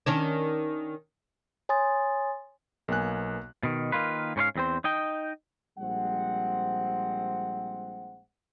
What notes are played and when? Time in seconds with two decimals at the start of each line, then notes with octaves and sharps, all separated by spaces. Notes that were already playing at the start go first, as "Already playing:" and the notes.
0.06 D#3 C#4 D4
1.69 C#5 G#5 C6 D#6 A6
2.88 B1 A#3 B3 G#5 F#6
3.63 B2 D#3
3.92 D#3 A#3 F4 B4
4.36 G#2 C#4 C5 F5
4.56 E2 C4 C5
4.84 D#4 D#5 G5
5.78 A#1 G3 G#3 C4 F#5